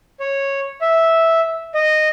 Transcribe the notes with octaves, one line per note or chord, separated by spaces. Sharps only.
C#5
E5
D#5